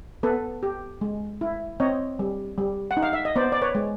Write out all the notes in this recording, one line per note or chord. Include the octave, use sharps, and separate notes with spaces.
B3 A4 B4
G4
G#3
E4
C4 C#5 D#5
G3
G3
F#5
D#4
F5
E5
D#5
B3 C5 D5
D5
B4 C#5
G#3